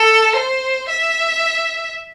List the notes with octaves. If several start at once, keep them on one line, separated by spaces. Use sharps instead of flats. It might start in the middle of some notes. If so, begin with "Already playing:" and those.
Already playing: A4
C5
E5